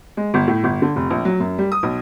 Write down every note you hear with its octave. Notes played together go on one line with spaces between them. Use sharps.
G#3
G1
A2
G1
D3
F1
A#1
F#3
F#2
G3
D#6
B1